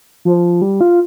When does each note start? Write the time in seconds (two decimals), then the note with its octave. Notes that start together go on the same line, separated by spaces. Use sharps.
0.25 F3
0.62 G3
0.81 F4